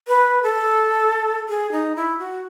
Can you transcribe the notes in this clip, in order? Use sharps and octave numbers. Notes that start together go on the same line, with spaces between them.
B4
A4
G#4
D#4
E4
F#4